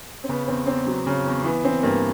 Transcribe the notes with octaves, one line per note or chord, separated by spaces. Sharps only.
C4
C#3 B3
E2 C4
E2 C4
F#3
C#3
E2
E3 B3
E3 C4
G2 A#3